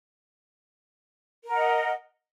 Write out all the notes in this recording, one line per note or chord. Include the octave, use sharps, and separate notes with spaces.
A#4 D#5 F#5